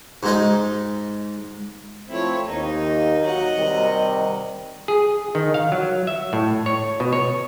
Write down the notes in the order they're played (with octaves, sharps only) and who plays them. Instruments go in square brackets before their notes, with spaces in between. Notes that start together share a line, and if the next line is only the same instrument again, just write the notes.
[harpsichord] G#2 G#3 D#4
[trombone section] F3 A3 C4 [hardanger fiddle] E4 C#5
[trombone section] D#2 [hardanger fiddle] D#4
[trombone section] F#3 [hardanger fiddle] D#5 F#5
[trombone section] C3 D#3 G3
[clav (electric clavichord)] G#4
D#3
F5
F#3
E5
A2
C#5
B2
C#5